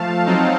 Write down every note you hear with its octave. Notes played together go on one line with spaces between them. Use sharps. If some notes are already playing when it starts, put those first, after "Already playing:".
Already playing: F3 A3 F5 A5
F#3 C4 D#4